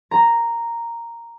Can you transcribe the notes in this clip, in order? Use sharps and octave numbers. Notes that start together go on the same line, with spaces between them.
A#5